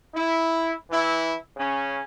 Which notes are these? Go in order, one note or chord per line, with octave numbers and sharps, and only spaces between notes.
E4
E3 E4
C#3 C#4